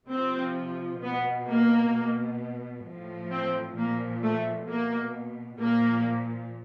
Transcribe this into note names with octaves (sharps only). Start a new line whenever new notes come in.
C3 F3 C4
B2 B3
A#3
B2
A2 F3
C4
A#2 F3 A#3
A3
B2 A#3
A#2 F3 A#3